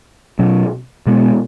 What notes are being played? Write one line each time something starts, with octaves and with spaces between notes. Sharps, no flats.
B2 F#3 C#4
B2 G#3 B3